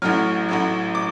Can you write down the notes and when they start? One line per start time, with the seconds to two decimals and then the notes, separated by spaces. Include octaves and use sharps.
0.02 A1 A2 F#3 F6
0.49 A1 A2 F#3
0.95 D6